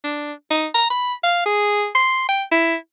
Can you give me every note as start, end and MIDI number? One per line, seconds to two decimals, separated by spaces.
0.04 0.33 62
0.50 0.67 63
0.74 0.88 82
0.90 1.14 83
1.24 1.45 77
1.46 1.88 68
1.95 2.29 84
2.29 2.44 79
2.52 2.75 64